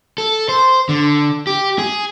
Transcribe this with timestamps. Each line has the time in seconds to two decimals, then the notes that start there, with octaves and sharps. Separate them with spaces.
0.18 A4
0.49 C5
0.89 D3
1.47 G4
1.78 G#4